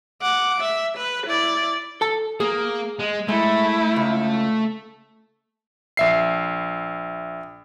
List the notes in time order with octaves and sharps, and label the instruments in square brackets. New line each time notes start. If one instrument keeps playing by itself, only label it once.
[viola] F#5 D6
E5
B4
E4 D5
[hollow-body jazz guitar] A4 A5
[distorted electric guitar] A#3 [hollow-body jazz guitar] G#4
[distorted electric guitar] G#3
[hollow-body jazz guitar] G#3 [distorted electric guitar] A3 [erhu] E4
[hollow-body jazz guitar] C#2
[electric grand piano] A#1 E5 C7